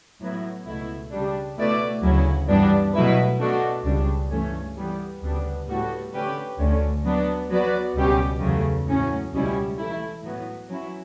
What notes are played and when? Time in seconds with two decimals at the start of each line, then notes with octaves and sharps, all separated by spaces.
0.21 A2 F#3 B3 E4
0.66 C#2 B2 A3 E4
1.11 C#3 G3 D4
1.58 B2 A3 E4 B4 D5
2.03 D2 C#3 F#3 C#4 E4
2.48 G2 E3 G3 B3 D4
2.93 B2 F#3 A3 E4 B4
3.40 B2 A3 D4 F#4
3.85 C#2 C#3 G3 D4
4.31 G2 E3 A3 C#4
4.76 E3 G3 B3
5.22 D2 C#3 G3 B3 D4
5.67 A2 G3 B3 F#4 A4
6.13 D3 A3 C#4 G4 B4
6.58 D2 D3 A3 C#4
7.04 F#3 B3 D4
7.50 F#3 B3 F#4 B4 D5
7.95 C#2 B2 G3 C#4 G4
8.41 E2 C#3 F#3 A3
8.86 A2 F#3 C#4
9.32 C#2 B2 G3 C#4 E4
9.78 E3 A3 E4
10.23 A2 F#3 B3
10.69 F#3 C#4 E4